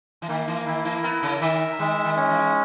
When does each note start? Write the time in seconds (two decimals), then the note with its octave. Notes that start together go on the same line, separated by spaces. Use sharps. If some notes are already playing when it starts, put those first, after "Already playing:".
0.22 E3
0.28 D#3 A#3
0.48 E3
0.66 D#3 E4
0.85 E3
1.03 B3 A#4
1.22 C#3
1.41 D#3 E5
1.79 D#3 G#3
2.04 D#3
2.17 C#4
2.29 E3